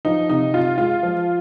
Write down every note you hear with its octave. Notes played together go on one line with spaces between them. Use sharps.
F3 D#4
C3 D#4
C3 F4
G#3 F4
F3